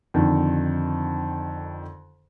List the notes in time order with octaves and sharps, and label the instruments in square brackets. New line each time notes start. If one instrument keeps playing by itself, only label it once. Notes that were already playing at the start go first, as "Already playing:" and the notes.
[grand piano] F2 D3 D#3